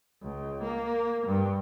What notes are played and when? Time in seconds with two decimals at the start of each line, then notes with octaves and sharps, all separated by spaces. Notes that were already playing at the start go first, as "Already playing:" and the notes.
0.22 C#2
0.63 A#3
1.26 G2